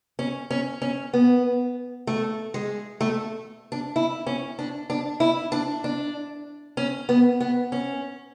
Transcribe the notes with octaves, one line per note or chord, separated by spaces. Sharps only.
C#4
C#4
C#4
B3
A3
G#3
A3
D4
E4
C#4
D4
D4
E4
D4
D4
C#4
B3
B3
C#4